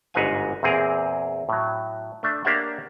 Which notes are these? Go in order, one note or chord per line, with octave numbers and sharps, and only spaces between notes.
G1 G#2 F#4 B4 F5 G#5
E2 A#2 C4 G#4 A#4 A#5
A2 F#3
A3 D4 E5
A#3 D4 G4 C#5 E5 F#5